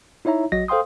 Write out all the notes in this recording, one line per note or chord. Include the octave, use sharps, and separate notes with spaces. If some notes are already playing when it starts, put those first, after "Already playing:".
D#4 E4 C#5 E5 A#5
A#1 F#3 F#4 D#5 A#6
A4 C5 F5 G5 C6 D#6